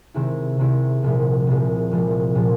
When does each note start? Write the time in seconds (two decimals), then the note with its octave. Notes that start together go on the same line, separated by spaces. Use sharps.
0.14 C3 D#3 G#3 C4 E4
0.59 C3 D#3 G#3 C4 E4
1.03 C2 A#2 F3 G#3
1.47 C2 A#2 F3 G#3
1.91 C2 A#2 F3 G#3
2.35 A#2 F3 G#3